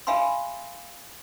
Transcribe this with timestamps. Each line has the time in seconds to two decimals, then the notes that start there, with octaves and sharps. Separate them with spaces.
0.07 E5 F5 G#5 B5 C6